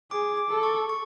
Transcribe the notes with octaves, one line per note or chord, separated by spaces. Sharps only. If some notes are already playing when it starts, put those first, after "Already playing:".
G#4 D6
D6
A4
C#6
C#6